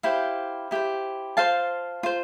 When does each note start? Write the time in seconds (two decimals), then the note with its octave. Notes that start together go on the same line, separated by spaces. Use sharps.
0.03 E4 G4 C5 F5
0.71 E4 G4 C5
1.37 F4 C5 F5 A5
2.03 F4 C5